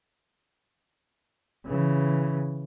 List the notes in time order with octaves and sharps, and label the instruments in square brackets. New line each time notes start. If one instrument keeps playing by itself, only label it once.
[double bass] C#3 E3